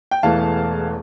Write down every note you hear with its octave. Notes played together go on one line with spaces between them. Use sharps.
G5
E1 E2 E3 A3 F5 A5